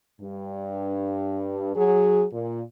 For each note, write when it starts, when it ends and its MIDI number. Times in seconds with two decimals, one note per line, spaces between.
0.20 1.73 43
1.76 2.24 54
1.76 2.24 68
2.33 2.61 46